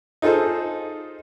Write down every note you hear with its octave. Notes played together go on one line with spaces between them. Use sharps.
D#4 F4 G#4 A4 C5